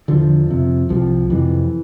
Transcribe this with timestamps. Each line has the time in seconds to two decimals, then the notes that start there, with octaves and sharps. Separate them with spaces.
0.08 E2 D3 F3
0.49 F2 C3
0.89 C2 C3 F3
1.30 F2 C3 E3